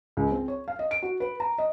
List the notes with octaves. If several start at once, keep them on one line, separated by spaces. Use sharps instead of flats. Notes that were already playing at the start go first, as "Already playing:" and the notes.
C#2
C4
C#5
F5
D#5
D7
F#4
B4
A#5
D#5